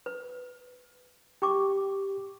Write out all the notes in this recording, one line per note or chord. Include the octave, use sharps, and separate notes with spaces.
B4
G4 G5 C#6 D6